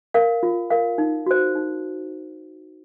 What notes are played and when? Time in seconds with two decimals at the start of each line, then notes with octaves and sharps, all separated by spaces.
0.14 A#4 F5
0.43 F4
0.70 A#4 F5
0.98 D#4
1.26 F#4 C5
1.56 D#4